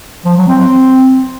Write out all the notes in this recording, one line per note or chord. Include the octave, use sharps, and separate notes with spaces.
F3
F#3
C4